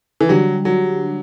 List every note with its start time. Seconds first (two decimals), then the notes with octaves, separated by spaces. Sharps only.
0.21 E3
0.29 D3 F#3 G3 D4 G4
0.65 F#3